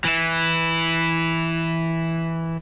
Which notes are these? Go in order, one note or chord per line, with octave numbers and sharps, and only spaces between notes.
E3 E4